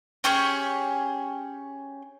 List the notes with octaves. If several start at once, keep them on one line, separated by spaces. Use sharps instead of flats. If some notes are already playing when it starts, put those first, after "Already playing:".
C#4 G4 G#4 C#5